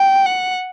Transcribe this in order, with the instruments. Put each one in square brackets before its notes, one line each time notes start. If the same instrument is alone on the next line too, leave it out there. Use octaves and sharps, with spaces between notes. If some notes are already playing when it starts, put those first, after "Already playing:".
Already playing: [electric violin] G5
F#5